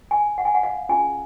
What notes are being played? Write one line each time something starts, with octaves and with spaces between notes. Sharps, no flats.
G#5
F#5
G#5
F#5
F5
C#4 F4 G#4 G#5